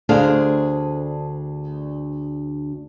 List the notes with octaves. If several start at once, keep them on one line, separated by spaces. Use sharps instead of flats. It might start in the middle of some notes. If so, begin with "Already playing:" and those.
D2 D4 G#4 A4 C5 F5